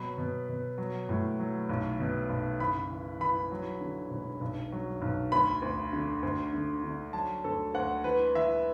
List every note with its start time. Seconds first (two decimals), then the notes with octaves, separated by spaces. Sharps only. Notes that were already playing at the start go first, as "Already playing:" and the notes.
Already playing: B2 F#3 B5
0.18 B2
0.49 B2
0.78 F#3
1.09 A2
1.39 F#3
1.69 B1
2.00 B2
2.29 B1
2.60 F#1 B5
2.91 E3
3.20 E3 B5
3.51 F#3
3.81 D3
4.11 E1
4.41 B1
4.72 F#3
5.02 B1
5.32 D2 B5
5.62 D2
5.93 D3
6.23 D2
6.53 D3
6.84 D3
7.13 F#3 A5
7.44 D2 A4
7.74 D2 F#5
8.04 E3 B4
8.35 E3 E5